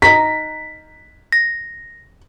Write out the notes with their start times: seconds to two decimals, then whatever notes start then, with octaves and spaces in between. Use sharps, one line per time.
0.02 D#4 A#5 B6
1.32 A#6